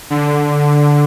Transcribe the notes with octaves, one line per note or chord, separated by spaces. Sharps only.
D3